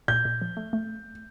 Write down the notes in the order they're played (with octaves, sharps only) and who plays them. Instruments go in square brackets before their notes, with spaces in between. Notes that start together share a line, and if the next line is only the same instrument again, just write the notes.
[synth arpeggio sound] A#2 [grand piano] G6
[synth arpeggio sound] A#2
F3
A3
A3